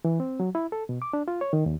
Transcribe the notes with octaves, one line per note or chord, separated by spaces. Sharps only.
E3
C4
F#3
E4
A4
B2
D6
D4
F4
C#5
D#3
D#2